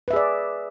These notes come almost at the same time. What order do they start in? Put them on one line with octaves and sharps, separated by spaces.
B4 E5 G#4 D5